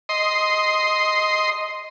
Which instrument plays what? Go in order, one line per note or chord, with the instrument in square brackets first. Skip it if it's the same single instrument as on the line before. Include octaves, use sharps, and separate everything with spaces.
[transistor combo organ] D#5 C6